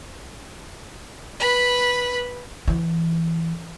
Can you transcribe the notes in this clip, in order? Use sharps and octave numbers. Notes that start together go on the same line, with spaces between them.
B4 B5
E3